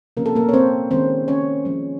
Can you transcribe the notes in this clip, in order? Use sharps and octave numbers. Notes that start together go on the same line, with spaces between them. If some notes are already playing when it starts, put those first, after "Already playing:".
C3 F3 A#3 C#4 A#4
A4
A#3 A#4
C#5
C4 C5
D#3 G#3 C4 C#4 C5
C#4 C#5
F3 G#3 C#4